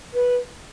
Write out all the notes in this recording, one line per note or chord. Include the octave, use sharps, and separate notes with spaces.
B4